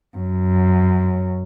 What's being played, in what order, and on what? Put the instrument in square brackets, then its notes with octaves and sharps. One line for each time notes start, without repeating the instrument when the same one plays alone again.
[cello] F#2